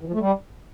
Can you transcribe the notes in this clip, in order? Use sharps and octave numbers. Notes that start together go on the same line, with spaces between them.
E3
F3
A3
G3